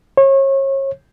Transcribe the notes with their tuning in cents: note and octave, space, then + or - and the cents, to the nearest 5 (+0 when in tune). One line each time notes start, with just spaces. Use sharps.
C#5 -35